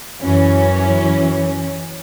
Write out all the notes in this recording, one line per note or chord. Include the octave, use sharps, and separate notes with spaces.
F#2 E3 C#4